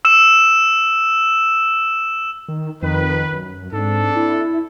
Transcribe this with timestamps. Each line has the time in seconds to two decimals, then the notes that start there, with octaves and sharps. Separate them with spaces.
0.05 E6 E7
2.49 D#3
2.82 F2 D#3 B4
3.33 F#2
3.73 G#2 C4 D4 A4
4.16 E4